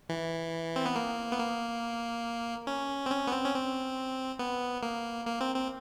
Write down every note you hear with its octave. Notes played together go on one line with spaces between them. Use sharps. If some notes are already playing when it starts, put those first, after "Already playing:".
E3
C4
B3
A#3
B3
A#3
C#4
C4
C#4
B3
C4
C#4
C4
B3
A#3
A#3
C4
C4